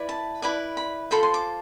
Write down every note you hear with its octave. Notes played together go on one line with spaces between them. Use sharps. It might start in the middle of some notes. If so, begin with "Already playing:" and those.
Already playing: E4 B4 D5
A5
E4 B4 D5
B5
F4 A4 C5 B5
C6
D6